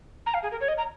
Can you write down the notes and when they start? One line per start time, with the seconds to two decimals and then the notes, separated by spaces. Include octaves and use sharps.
0.26 A#5
0.34 F5
0.43 G#4
0.52 A#4
0.61 C#5
0.68 D#5
0.78 A#5